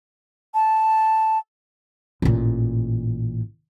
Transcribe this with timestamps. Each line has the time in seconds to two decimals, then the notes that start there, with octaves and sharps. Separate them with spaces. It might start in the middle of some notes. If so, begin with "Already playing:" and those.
0.54 A5
2.22 A1 A#2